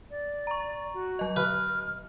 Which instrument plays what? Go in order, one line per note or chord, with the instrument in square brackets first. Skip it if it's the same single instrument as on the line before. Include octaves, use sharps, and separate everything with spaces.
[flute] D5
[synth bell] A#5 C#6
[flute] F#4
[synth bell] F#3 D#5
[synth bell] D3 [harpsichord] B4 [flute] F6